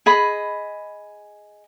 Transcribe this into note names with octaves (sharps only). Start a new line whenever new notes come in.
G#4 D#5 B5